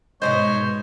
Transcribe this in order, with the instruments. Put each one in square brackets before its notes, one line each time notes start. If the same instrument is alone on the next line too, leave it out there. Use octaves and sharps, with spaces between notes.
[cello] G#2 [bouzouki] B2 F#3 D#5 [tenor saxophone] C5 [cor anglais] C#5